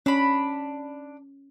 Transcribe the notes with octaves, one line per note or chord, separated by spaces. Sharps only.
C#4 D4 B5